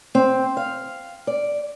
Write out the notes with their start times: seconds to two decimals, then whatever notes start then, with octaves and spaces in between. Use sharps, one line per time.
0.15 C4
0.57 F5
1.27 D5